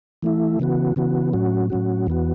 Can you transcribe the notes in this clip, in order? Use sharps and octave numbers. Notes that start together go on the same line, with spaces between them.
E3 A3 E4
C#3 E3 B3 F#4
C#3 E3 B3 F#4
A2 F#3 C#4 F#4
A2 F#3 C#4 F#4
E2 E3 B3 F#4